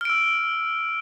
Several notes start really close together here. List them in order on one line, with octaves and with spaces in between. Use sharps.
F6 D7 E6